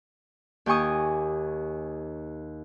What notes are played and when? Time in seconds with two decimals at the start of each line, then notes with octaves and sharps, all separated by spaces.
0.66 D#2 G4 G#5 C#6 D#6